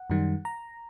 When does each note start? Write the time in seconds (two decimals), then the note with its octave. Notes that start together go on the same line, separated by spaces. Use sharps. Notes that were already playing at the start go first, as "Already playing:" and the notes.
Already playing: F#5
0.10 F#2 D#3 G3
0.45 A#5